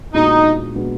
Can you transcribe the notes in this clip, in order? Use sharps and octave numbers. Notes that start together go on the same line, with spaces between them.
A#2 G#3 B3 D4 D#4 F#4
A#2 G#3 B3 D4 F#4